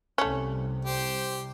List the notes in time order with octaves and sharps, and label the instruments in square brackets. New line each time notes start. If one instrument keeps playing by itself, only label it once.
[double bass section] C2 C3 [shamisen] A3 C#4
[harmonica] G4 C5